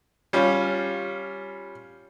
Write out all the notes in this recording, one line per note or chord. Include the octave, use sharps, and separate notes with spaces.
G3 C#4 F4